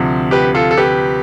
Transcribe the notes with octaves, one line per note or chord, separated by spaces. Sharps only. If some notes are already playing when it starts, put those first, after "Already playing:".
Already playing: D2 C3 F3
G4 B4
F4 A4
A4
G4 B4